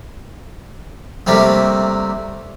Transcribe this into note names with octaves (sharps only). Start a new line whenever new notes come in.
C3 G3 A3 A#3 C4